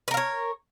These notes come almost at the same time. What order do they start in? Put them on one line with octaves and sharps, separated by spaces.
B4 A#4 F5 C#5